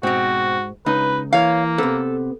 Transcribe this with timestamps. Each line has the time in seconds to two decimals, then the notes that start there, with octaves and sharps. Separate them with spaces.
0.03 G#2 B2 C4 F#4
0.86 C#2 D#4 B4
1.33 E3 A#3 C#5 F5
1.78 C3 B3 A4